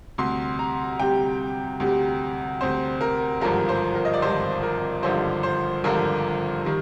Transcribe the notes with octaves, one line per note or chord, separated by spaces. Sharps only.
D2 C3 G3 C6
A#5
D2 C3 G3 G5
D2 C3 G3
D2 C3 G3 C5
A#4
G#1 G2 D3 F3 A#4
C5
A#4
D#5
D5
G#1 G2 D3 F3 C5
A#4
G#1 G2 D3 F3 C5
C5
G#1 G2 D3 F3 A#4
D#3 G3